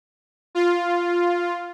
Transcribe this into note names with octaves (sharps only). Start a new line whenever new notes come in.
F4